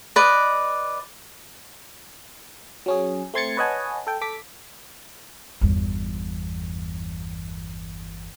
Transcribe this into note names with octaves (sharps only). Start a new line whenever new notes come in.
B4 D5 D#5
F#3 C#4 G#4
A3 C4 C6 G#6 A6 C#7
B4 C#5 D#5 F#5 G#5 A5
A4 G5
A4 D6 B6
G1 E2